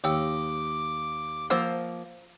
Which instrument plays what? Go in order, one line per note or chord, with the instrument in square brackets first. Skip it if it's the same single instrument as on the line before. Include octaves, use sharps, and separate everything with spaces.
[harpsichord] D#2 [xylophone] C#5 G5 E6 [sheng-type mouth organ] D6
[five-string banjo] F3 A#3 C5 [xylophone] F#5 E6 E7